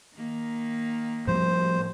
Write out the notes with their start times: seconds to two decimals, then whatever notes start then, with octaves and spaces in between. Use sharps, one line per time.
0.15 D#3 A#3
1.27 A2 F3 G3 C5